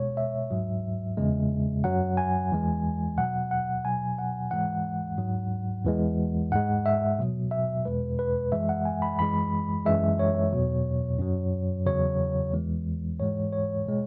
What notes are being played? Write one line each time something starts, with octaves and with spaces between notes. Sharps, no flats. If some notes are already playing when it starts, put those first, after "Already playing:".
Already playing: B2 G#3 C#5
E5
G#2 F#3
E2 C#3 G#3
F#2 F#3 F#5
G#5
E2 E3 G#3
B2 F#3 F#5
F#5
B2 F#3 G#5
F#5
G#2 E3 G#3 F#5
G#2 F#3
E2 E3 G#3
G#2 G#3 F#5
E5
B2 F#3
E5
E2 B2 G#3 B4
B4
F#2 E3 G#3 E5
F#5
G#5
B5
F#2 E3 G#3 B5
F#2 E3 G#3 E5
C#5
E2 B2 F#3
F#2 F#3
E2 C#3 F#3 C#5
E2 E3 G#3
G#2 E3 G#3 C#5
C#5
B2 G#3